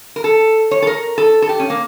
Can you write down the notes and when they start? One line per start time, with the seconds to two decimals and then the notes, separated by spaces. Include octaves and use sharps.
0.16 A#4
0.24 A4
0.71 C#5
0.82 A4
0.87 A#4
1.18 A4
1.42 A4
1.49 G4
1.60 C#4
1.70 A#3